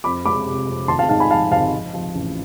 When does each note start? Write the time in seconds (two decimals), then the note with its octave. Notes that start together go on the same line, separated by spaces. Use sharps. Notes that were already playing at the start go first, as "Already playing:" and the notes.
0.04 F2 B5 D6
0.25 G#3 B5 D6
0.46 C3
0.67 F2
0.88 G#1 A5 C6
0.99 F5 A5
1.09 G#2 F5 A5
1.20 G#5 B5
1.31 F3 F5 A5
1.52 G#1 F5 A5
1.72 F3
1.94 F3
2.15 A1